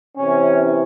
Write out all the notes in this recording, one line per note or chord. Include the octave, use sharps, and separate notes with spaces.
C3 E3 C#4